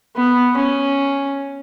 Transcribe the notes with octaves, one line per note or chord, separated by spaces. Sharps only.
B3
C#4